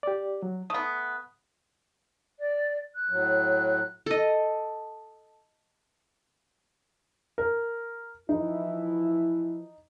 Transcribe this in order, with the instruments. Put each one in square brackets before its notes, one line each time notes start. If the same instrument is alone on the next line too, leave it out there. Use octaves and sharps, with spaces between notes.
[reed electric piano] G4 D5
F#3
[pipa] A3 B3 [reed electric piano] D#6
[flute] D5
F#6
[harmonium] A2 F#3
[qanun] A4 D#5
[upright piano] A#4
[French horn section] E3 F3 E4 [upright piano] D#4